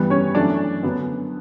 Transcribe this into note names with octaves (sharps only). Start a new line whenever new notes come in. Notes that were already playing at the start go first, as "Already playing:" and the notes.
Already playing: G2 E3 G3 B3
C#4 C#5
F#2 E3 A3 C#4 D4 D5
F#2 D3 F#3 B3